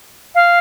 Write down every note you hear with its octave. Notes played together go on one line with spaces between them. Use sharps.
F5